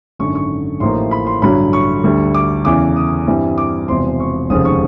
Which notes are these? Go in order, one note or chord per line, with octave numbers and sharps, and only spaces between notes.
G#1 F#2 D3 C#6
C#6
A1 A2 F3 A#3 D#4 C6
B5
C6
A1 G2 D3 F#3 B5
C#6
D2 D3 G3
D6
E2 C#3 E3 D6
D#6
G2 E3 G3 C4 E4
D6
E1 E2 C3 F3 C6
C#6
F1 D#2 C#3 F3 G#3 D#6
C#6